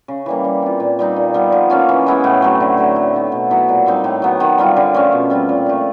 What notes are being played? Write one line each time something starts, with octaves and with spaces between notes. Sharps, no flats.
C#3
E3 G3 A#3
G3
C4 F4
A#2
G3 C4 D#4
A#2
G3 B3
F3
A#3 C#4 F4
E3
G#3 B3 E4
A2
F#3 A3 C4
D3
F#3 A3 D4
F#3
B3 D#4
B2
F#3 B3 E4
A#2
G3 C4 D#4
A2
F#3 B3
D#3
G3 C4 F4
D3
F3 A3 C#4
B2
G3 C4 F4
A#2
F3 A3